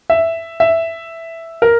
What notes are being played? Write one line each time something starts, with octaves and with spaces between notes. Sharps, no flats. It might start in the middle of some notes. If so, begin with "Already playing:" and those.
E5
E5
A#4